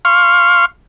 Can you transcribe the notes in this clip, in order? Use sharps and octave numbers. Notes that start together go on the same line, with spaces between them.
F5 C6 C#6 F6